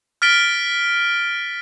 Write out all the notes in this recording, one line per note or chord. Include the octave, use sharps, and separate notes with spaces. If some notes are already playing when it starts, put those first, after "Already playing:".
F6 A6 B6 D7 G7